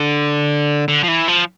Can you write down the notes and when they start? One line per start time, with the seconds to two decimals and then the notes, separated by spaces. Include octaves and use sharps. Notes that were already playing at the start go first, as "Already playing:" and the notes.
Already playing: D3
0.88 D3
1.03 F3
1.08 E3
1.28 F3